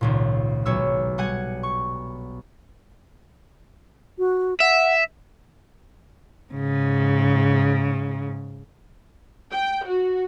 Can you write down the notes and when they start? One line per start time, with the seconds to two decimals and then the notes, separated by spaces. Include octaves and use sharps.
0.01 G#1 C#2 A#2
0.65 B1 C#5 E6
1.18 G3 F#5 G#5 G#6 C#7
1.63 C#6
4.19 F#4
4.60 E5 F#5
6.52 G#2 C#3
9.52 G5
9.86 F#4